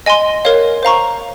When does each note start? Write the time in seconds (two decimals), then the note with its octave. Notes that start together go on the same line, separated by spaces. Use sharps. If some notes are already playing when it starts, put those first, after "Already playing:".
0.06 D#5 G#5 C6
0.45 A#4 C#5 F5
0.83 C5 F5 A#5 C#6